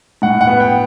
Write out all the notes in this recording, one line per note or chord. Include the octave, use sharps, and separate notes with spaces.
A2 F#5
F#5
B3
G5